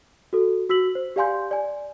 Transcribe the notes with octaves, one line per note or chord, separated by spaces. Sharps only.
F#4 A4
F#4 E6 B6 F#7
C5
G4 D5 F5 G#5 C6 G6
D5 G#5